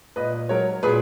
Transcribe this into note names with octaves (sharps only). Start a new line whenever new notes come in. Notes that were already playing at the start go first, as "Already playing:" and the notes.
A#2 B4 D#5
F#3 A#4 C#5
A#2 G#4 B4